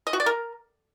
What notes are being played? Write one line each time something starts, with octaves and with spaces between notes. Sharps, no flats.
D#5
F#4
D5
A#4